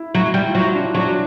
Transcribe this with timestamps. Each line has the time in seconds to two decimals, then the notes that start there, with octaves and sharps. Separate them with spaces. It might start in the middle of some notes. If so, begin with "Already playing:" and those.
Already playing: E4
0.15 F#3 E4
0.34 G3
0.49 F4
0.55 F#3 E4
0.75 D4
0.95 F#3 D4